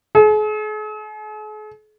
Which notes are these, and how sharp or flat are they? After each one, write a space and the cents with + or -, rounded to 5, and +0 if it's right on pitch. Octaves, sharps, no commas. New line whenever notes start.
G#4 +45